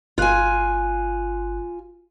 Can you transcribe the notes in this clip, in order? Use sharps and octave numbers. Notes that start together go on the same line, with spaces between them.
G1 F4 G#5 F#6